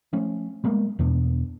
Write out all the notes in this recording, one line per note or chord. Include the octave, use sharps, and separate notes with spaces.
F3 A3 C#4
G3 G#3 A#3 B3
E2 B2 B3 D4